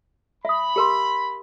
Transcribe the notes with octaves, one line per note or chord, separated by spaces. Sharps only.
E5 B5 D#6
G4 A#4 C6